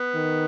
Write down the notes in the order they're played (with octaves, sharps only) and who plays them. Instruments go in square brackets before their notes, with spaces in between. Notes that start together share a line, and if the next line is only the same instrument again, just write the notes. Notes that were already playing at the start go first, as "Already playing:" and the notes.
Already playing: [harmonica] B3
[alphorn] D#3